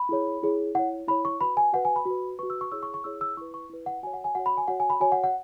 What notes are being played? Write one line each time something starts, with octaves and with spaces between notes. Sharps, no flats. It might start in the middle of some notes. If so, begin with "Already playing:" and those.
Already playing: B5
E4 G#4 C#5
E4 G#4 C#5
E4 C#5 F#5
E4 C#5 B5
C#6
F#4 B4 B5
G#5
F#4 B4 F#5
G#5
B5
F#4 B4
F#4 B4 C#6
E6
C#6
E4 G#4 C#5 E6
C#6
C#6
E4 G#4 C#5 E6
E6
E4 B4 C#6
C#6
E4 B4
F#5
F#4 C#5 G#5
F#5
G#5
F#4 C#5 F#5
B5
G#5
F#4 C#5 F#5
G#5
B5
F#4 C#5 G#5
F#5
F#5